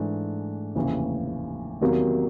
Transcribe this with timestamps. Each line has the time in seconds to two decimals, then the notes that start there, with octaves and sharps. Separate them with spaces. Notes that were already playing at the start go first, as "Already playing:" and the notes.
Already playing: G#2 E3 A3 D4
0.75 F1 D#2 C#3 E3
1.81 E2 C3 D#3 F#3 A#3